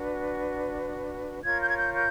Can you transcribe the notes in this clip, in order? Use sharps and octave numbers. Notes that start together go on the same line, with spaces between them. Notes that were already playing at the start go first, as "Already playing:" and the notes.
Already playing: D4 F#4 B4
F4 A#4 C#5 G#6
G6
G#6
G6
G6